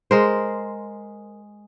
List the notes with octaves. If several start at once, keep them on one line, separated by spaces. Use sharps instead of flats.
G#3 A#4 C5